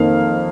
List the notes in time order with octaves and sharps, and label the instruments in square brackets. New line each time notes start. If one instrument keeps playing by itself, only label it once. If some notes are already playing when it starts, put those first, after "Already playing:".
Already playing: [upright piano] F2 D#3 A#3 F5